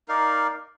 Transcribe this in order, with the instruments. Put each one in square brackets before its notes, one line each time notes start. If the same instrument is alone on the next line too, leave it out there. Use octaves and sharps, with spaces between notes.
[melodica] D#4 A#4 D5 F5